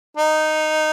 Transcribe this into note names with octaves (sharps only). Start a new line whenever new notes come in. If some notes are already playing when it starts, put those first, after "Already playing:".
D#4